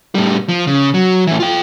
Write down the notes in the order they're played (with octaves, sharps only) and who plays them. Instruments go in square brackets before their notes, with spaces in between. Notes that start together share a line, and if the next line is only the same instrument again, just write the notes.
[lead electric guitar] A2 G3
F3
C#3
F#3
A2 E3
F4 G5